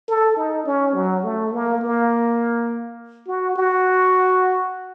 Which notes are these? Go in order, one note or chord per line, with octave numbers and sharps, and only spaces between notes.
A4
D#4
C#4
F#3
A3
A#3
A#3
F#4
F#4